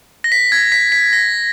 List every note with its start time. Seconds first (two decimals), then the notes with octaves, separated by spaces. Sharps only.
0.24 A#6
0.32 B6
0.52 G#6
0.72 B6
0.92 B6
1.13 A#6